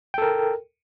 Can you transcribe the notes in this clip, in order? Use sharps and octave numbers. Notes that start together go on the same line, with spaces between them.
A4 A#4 G5